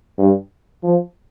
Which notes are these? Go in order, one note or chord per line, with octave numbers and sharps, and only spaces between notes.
G2
F3